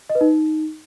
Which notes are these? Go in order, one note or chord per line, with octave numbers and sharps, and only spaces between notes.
D#5
B4
D#4